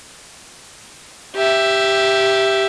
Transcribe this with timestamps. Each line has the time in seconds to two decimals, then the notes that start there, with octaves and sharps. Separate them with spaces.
1.35 G4 E5